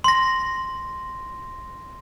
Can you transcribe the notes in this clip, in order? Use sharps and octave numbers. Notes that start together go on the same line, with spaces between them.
C6 A#6